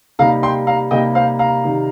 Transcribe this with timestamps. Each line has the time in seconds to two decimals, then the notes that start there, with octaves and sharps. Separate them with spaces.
0.19 C3 G3 A#3 D#4 F5 A#5
0.43 G5 C6
0.67 F5 A#5
0.91 C3 G3 A#3 D#4 D#5 G5
1.15 C5 F5
1.39 F5 A#5
1.64 C3 D#3 G3 D#4